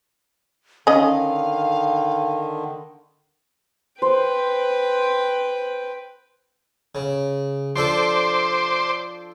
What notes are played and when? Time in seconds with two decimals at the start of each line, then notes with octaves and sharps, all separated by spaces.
0.87 D3 D#3 C#4 D#5 F5
4.02 B4 C5 G5
6.95 C#3
7.76 F3 D4 A4 C5 C6 D6